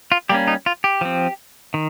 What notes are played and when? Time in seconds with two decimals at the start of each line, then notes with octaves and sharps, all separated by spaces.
0.12 F4
0.29 G3 A#3 C#4 G4
0.48 D#4
0.66 F4
0.84 G4
1.01 F3 C4
1.74 D#3